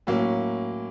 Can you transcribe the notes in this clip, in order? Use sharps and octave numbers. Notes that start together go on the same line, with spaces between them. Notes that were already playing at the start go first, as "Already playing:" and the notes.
A2 F#3 A#3 C#4